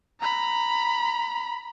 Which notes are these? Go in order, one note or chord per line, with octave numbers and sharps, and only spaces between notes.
A#5 B5